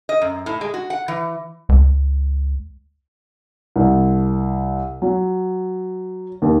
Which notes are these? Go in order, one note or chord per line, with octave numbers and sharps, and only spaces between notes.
D#5
F#2
A2
G#3
F#4
F#5
E3
C#2
C2
F#3
D#2